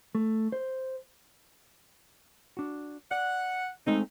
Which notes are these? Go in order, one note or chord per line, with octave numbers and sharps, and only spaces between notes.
A3
C5
D4 F#4
D5 F#5
G#3 A3 C4 D#4